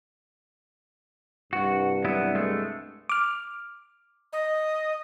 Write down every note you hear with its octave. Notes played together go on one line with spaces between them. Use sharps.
C2 G2 F#4
F#3 B3 E4
G#3 A3
D6 F6
D#5